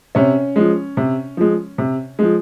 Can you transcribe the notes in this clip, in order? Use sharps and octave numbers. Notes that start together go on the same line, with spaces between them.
C3 C#4
F3 G#3
C3
F3 G#3
C3
F3 G#3